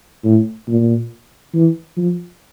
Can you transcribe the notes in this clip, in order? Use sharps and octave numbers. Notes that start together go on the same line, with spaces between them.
A2
A#2
E3
F3